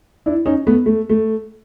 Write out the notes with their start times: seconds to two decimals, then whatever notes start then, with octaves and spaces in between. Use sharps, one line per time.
0.26 D4 E4
0.46 C#4 D#4
0.67 A3 B3
0.86 A3
1.09 A3